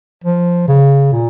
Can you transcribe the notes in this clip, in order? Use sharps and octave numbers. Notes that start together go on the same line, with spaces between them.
F3
C#3
A#2